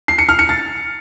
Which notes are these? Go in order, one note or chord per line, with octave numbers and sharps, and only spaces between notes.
C7
C#7
F6
C#7
A6